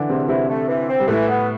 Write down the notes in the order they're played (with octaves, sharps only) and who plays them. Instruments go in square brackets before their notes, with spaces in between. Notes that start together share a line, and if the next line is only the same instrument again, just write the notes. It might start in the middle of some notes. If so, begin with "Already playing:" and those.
Already playing: [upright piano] D3 E3 D4 E4
[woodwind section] E2 [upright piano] C3 C4
[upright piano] C3 C4 [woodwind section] E4
[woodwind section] A3
E3
C4
[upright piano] G3
[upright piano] A2 A3 [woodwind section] E3
[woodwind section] B3